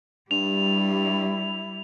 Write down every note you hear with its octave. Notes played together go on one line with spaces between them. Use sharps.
G2 G3 E4 F7